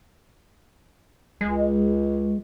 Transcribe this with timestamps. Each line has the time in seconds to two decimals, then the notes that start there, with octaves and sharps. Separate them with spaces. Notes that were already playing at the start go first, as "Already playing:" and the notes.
1.41 C#2 G#3